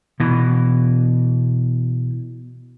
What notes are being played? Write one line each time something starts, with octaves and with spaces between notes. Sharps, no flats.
B2 E3